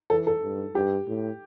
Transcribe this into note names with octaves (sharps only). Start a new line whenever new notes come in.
E3 A4
A4
G2
G2 G4
A2